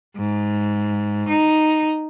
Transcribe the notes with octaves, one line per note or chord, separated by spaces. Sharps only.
G#2
D#4